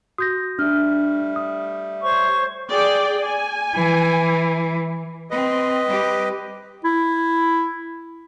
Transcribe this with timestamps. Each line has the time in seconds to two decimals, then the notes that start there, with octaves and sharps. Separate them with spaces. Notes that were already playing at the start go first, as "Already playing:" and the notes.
0.18 F#4 D#6 G6 A#6
0.59 G3 A3 D4 F6
1.36 D#6
2.02 C5 C#5 C#6
2.71 G#4 D5 G5
3.24 G#5
3.75 E3
5.31 C4 B4 D#5
5.87 G3 C4 G4
6.84 E4